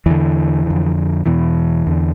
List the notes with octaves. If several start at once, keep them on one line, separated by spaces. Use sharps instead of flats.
E2 D3 E3
F2 D3
E2 B2 E3
E2 D3